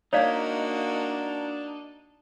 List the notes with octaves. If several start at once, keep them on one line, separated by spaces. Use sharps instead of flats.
A#3 D4 D#4 F#4 C#5 D5 F5